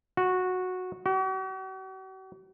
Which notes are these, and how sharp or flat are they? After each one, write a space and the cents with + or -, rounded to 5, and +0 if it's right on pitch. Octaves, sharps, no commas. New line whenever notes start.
F#4 -10
F#4 +45